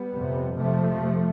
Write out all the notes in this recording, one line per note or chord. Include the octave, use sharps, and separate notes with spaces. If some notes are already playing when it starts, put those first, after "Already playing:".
Already playing: G3 B3
F2 C3
F2 C3 F3 A3
C3